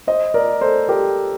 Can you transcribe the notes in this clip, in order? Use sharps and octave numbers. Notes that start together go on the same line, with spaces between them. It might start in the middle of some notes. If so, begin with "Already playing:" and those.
C5 D#5
A#4 D5
A4 C5
G4 A#4